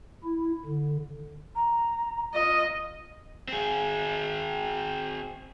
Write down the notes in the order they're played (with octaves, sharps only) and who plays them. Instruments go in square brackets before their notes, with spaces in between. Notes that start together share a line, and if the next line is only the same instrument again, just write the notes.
[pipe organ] E4
D3
[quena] A#5
[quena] F4 [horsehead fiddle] D#5
[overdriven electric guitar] C4 G#4